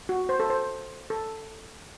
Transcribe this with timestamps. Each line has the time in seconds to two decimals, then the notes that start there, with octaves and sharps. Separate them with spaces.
0.09 F#4
0.29 C5
0.40 A4
0.50 C5
1.10 A4